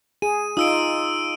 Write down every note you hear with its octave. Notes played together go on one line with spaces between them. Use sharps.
G#4 D#7
D#4 F4 D#6 E6 D7